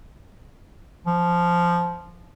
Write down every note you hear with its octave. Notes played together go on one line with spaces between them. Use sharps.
F3